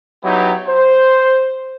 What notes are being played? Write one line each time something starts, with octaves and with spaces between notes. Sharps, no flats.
F#3 B3 D#4 E4 G4
C5